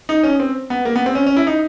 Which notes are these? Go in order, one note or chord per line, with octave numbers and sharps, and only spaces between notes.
D#4
C#4
C4
B3
A#3
B3
C4
C#4
C#4
E4
D#4